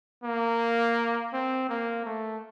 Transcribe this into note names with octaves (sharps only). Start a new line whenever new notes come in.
A#3
C4
A#3
A3